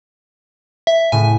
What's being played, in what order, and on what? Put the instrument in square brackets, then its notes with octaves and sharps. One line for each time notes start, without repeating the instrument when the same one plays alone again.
[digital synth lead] E5
[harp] A2 C#3 [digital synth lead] G#5